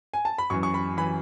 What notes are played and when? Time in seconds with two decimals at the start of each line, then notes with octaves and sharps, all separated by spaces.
0.14 G#5
0.25 A5
0.38 B5
0.50 F#2 E3 C#6
0.63 C#6
0.74 B5
0.97 E3 B5